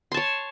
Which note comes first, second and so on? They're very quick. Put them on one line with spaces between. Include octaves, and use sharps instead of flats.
C6 A5 C#5